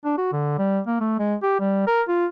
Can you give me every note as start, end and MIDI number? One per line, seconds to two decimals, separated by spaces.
0.04 0.13 62
0.18 0.31 66
0.32 0.56 50
0.58 0.80 55
0.87 1.00 58
1.00 1.15 57
1.19 1.35 56
1.43 1.55 67
1.60 1.86 55
1.87 2.02 70
2.08 2.26 65